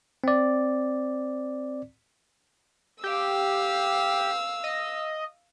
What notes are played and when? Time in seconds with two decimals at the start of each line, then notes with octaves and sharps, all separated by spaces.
0.24 C4 D5
3.04 G4 F5 E6
4.64 D#5